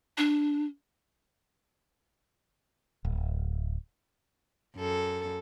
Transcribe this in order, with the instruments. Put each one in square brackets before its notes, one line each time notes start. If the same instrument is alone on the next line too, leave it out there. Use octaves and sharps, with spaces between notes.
[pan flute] D4
[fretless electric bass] D1
[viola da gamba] F#2 A4